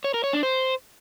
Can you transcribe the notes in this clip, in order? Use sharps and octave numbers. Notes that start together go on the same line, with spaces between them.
C#5
A#4
C#5
D4
C5